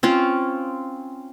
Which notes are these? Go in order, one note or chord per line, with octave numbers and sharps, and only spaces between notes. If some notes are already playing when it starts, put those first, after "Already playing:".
C4 C#4 F4